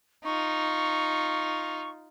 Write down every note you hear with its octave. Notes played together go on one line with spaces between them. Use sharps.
D#4 F4 C#6